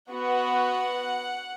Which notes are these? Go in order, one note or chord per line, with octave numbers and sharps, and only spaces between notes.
B3 F#4 F#5